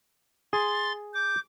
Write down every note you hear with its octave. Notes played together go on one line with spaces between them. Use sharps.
G#4 C6 A6
D6 G6